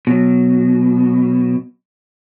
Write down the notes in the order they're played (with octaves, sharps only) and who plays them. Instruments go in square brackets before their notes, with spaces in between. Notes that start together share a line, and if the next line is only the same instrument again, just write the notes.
[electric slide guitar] B2 F#3